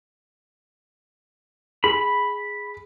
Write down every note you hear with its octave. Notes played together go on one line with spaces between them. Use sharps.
G#4 B5